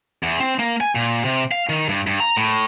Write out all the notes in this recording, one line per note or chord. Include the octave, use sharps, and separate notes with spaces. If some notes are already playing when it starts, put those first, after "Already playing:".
E2
C4
A#3
G#5
A#2
C3
F5
D#3
G2
G2
A#5
A2